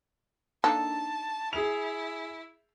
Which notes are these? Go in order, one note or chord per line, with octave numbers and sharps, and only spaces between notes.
A#3 D4 D#4 A4 A5
E4 G#4 F7